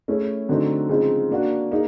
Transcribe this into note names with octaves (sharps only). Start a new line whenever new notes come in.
A3 C#4 E4 G#4
D3 F#3 A3 C4 D#4
C#3 F3 G#3 C4 D#4
A#3 D4 F#4
A#3 D#4 G#4